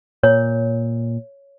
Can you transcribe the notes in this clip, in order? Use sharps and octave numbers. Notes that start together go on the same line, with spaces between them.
A#2 C#5